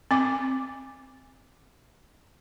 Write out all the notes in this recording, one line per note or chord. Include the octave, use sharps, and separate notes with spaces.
C4 D6